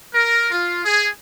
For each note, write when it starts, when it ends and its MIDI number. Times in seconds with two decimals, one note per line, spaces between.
0.14 0.51 70
0.51 0.84 65
0.85 1.07 68